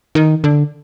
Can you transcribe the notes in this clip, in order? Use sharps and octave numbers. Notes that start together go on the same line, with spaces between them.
D#3
D3